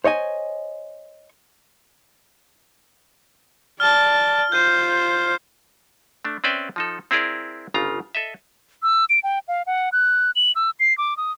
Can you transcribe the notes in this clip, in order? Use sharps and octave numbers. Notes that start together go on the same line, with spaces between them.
C5 C#5 D#5 G#5
D5 A5 F6 G7
F4 C5 G6 D#7
A3 D4
C4 C#4 B4 D5 E5 G5
F3 D#4 A4
C4 E4 G#4 A#4 D5
G1 C#3 F4 A#5
A4 D#5 E5
E6
D7
G5
F5
F#5
F#6
F#7
E6
C7
D6
D#6